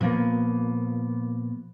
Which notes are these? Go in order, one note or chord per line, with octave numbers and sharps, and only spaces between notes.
A#2 F3 A#3 B3